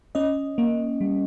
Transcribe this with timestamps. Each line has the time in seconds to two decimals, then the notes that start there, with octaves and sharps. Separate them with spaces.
0.15 C#4 D#5
0.58 A#3
1.01 G3